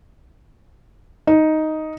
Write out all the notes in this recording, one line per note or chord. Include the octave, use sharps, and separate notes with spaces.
D#4